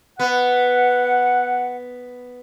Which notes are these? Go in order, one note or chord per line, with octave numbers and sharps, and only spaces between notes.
B3 F#5